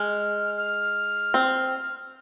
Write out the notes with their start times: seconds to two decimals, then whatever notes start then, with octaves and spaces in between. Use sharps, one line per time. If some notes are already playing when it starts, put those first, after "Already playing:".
Already playing: G#3 F6
0.58 F6
1.34 C4